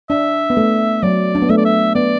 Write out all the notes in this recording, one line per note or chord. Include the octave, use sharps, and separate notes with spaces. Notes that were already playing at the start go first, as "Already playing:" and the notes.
D4 E5
B3
A3
F#3 D5
D4
B3
A3 E5
D5
E5
B3 D5